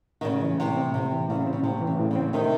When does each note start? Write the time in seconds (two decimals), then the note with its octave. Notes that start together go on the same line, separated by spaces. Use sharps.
0.21 D#3
0.25 A2 C#3
0.42 E3
0.59 A2 C3
0.77 C4
0.94 A2 C3
1.12 E3
1.29 A2 C#3
1.46 C4
1.53 C#3
1.63 A2 C3
1.81 E3
1.87 C#3
1.99 A2
2.11 C#3 C4
2.33 A2 C3 D#3